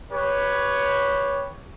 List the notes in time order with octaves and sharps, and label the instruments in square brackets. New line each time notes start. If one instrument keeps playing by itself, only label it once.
[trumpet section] G4 B4 C#5